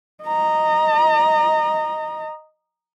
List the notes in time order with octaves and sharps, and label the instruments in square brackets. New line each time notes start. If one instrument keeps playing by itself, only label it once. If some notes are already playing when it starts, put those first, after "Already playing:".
[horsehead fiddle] D#5 A#5